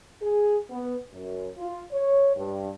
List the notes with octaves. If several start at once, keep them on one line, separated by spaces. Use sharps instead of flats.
G#4
B3
F#2
F4
C#5
G2